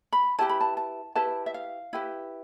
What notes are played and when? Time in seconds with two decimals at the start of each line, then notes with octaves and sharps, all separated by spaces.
0.12 B5
0.39 E4 G4 B4 A5
0.49 B5
0.61 A5
0.77 A5
1.15 E4 G4 B4 A5
1.46 E5
1.54 F5
1.93 E4 G4 B4